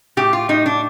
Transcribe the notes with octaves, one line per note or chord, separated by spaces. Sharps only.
A2 G4
F4
A2 D#4
D4